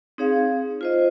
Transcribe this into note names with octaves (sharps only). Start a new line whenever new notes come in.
C4 D#4 G#4 C#5 F5
F4 C5 D#5